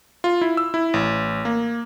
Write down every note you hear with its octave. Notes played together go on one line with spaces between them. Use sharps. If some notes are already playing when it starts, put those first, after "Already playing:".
F4
E4
E6
E4
A1
A#3